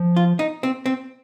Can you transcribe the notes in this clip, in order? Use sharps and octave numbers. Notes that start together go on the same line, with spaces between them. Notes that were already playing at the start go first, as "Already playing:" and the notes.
Already playing: F3
F4
D#4
C4
C4